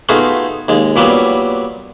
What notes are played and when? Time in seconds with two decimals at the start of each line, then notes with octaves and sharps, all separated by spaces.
0.09 A3 B3 D#4 F4 F#4 G#4
0.68 D#2 G#3
0.96 A#2 F#3 G3 B3